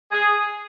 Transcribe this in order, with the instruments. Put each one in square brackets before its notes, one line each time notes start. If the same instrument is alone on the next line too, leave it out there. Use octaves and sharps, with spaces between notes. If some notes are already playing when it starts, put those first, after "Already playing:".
[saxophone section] G#4